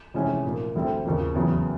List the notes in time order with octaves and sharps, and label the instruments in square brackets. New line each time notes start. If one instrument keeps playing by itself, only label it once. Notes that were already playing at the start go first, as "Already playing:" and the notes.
[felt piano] F2 C3 E3 G#3 C#4
A#2 F3 A#3
D2 D3 G3 C4
D#2 C#3 F3 A#3
E2 C#3 F#3 B3